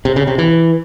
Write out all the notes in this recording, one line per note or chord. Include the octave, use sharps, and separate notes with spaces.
C3
C#3
C3
E3